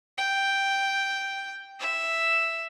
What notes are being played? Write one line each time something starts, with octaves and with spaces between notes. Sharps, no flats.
G5
E5